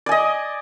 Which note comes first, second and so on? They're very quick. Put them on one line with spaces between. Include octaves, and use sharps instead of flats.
D5 G#5 D#5